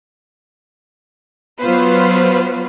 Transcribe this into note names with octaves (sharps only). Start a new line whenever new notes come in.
F#3 B3 F4 B4 C5